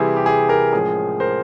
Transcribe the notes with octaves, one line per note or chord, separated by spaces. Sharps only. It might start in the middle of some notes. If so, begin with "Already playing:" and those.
Already playing: C3 E3 G3 C4 E4 G#4
G4
G#4
G#4 A#4
A2 F3 G#3 C#4 G#4
A#4 C5